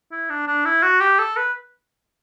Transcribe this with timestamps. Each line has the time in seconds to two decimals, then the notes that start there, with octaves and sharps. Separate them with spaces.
0.12 E4
0.30 D4
0.47 D4
0.65 E4
0.83 F#4
1.01 G4
1.19 A4
1.37 B4